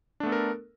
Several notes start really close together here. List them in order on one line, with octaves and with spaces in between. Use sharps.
D4 A3 B3 A4 A#4